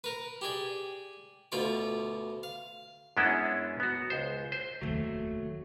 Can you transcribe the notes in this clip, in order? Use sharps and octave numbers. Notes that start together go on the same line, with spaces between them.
A#4 B4
G4 G#4 D5
D2 B2 F4 D5 B5 D6
F5
F#2 G#3 B3 C#4 D4 E4
B3 F#4
C#2 C5
C5
F1 D#2 F#3 A3